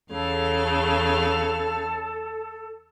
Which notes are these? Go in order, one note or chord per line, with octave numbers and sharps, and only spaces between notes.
E2 C#3 A4 F5